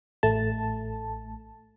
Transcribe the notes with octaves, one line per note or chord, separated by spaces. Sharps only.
A1 A3 A5